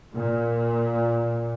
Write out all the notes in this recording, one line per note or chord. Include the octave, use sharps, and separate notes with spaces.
A#2